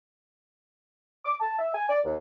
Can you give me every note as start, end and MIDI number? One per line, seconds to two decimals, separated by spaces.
1.24 1.34 86
1.40 1.56 81
1.59 1.72 76
1.74 1.86 80
1.89 1.99 74
2.04 2.15 39